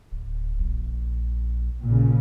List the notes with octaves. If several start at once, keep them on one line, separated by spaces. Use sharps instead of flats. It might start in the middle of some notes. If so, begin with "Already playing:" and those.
D1
A#1
A#2 C#3